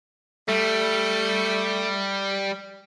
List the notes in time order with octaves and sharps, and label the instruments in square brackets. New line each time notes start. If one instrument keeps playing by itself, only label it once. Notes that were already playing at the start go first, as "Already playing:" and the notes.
[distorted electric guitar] G3 [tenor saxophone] A3